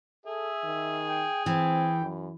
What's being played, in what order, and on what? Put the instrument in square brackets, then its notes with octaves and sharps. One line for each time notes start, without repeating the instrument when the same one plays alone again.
[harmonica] G#4 [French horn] A4 [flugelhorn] E5
[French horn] D#3
[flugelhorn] G5
[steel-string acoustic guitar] E3 [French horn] C4 [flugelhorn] G5
[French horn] F#2